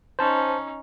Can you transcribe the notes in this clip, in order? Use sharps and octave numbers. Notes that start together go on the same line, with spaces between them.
C#4 D#4 C5 A5